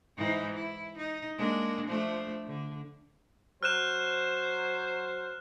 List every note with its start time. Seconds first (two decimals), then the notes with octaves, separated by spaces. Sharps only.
0.17 G#2 E3 D#4
0.54 E4
0.98 D#4
1.38 G#3 A#3 D4
1.87 F3 A3 D4
2.48 D3
3.63 F#3 C5 F6 F#6 E7